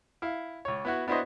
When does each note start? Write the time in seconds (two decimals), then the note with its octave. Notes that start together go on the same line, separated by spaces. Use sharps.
0.22 E4 F5
0.65 C#2 C#5
0.85 B3 E4 F#4
1.08 B3 D4 E4 F#4 C5 D#5